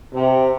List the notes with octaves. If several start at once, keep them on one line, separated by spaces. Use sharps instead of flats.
C3